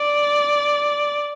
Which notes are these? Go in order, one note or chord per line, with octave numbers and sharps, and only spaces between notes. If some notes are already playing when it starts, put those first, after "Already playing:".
Already playing: D5